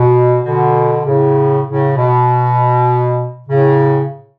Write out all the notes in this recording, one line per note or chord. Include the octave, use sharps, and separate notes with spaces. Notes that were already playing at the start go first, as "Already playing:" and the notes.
Already playing: B2
B2 D3
A2 C#3
A2 C#3
B2
A2 C#3